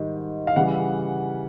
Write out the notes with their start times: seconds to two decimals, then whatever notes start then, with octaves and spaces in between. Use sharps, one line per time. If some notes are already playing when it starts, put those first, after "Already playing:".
Already playing: G#2 D#3 G3
0.47 F5
0.56 C#3 E3 G3 F#5